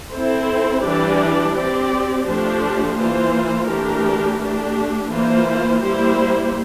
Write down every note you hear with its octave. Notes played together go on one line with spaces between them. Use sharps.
C4 E4 A4 C5
E3 G3 D4 G4 D5
C4 G4 D5
F3 A3 D4 G4 C5
E3 A#3 F4 C5
E3 A3 D4 G4 A#4
A3 D4 G4
E3 A#3 F4 C5
G3 A#3 E4 G4 C5